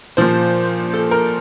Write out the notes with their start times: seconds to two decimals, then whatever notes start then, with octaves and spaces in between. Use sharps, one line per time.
0.17 A#2 F3 C5
0.94 A4
1.11 A#4